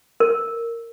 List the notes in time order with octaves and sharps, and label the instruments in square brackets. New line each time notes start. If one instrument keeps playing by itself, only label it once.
[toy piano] A#4